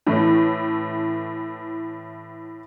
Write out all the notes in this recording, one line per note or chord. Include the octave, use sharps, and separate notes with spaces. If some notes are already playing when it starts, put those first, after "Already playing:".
A2 E3 A3 C#4